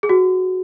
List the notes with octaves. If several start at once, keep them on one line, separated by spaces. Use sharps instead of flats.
G#4
F#4